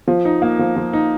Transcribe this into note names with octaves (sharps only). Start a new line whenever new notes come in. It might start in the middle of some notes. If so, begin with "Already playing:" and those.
F3
D#4
A#3
F3
F3
D#4